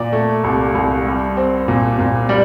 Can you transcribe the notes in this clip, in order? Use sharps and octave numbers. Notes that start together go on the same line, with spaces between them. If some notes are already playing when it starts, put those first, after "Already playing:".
Already playing: A#2 D5
A3
C2
C2
G3
C4
A#2
A#2
G3 D5